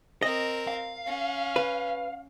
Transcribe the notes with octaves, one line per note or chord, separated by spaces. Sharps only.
C4 A#4 D#5
F5
C#4
B4